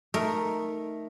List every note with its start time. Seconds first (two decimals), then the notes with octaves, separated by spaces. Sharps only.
0.14 A3 D#4 A#4